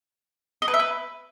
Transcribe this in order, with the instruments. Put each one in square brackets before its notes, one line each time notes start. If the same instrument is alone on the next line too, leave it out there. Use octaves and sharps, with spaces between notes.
[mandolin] D#5
B4
E5
B4